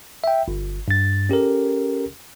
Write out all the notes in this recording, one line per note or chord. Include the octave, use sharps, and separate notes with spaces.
E5 G5
G1
G2 A6
C#4 G4 A4 A#4